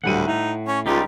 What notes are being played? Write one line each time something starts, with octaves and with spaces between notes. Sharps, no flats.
D#1 D2 A2 G3 F#5 D#7
D#4 E4
C#4 C#6
C#2 G3 D#4 F4 G4